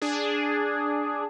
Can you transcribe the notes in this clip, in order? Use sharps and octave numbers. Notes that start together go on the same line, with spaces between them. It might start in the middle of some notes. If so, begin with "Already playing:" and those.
D4 G#4